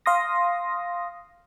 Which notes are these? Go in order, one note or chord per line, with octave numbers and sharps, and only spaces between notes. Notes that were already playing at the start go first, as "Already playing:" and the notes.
F5 C6 D#6 A#6